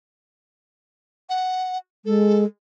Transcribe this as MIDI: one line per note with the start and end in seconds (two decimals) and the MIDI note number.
1.29 1.77 78
2.05 2.45 56
2.05 2.45 69